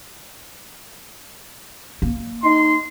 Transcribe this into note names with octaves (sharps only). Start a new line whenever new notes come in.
A#3
D#4 C6